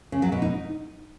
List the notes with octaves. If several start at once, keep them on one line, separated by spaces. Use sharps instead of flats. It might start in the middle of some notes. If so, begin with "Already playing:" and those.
C#3
F#3
B2
D#4